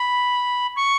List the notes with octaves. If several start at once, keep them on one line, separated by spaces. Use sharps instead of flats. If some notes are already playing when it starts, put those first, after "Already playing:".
Already playing: B5
C#6